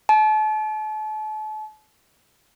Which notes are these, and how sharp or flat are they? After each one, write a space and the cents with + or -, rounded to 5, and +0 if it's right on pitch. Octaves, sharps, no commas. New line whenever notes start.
A5 -35